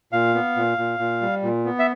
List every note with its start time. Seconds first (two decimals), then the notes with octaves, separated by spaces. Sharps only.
0.12 A#2 F5
0.34 B3
0.56 A#2
0.78 A#2
0.99 A#2
1.22 G3
1.43 A#2
1.65 B3
1.79 E5